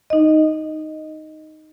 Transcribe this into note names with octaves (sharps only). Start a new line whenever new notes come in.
D#4 D#5